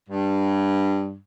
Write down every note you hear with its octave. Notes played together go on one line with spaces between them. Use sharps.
G2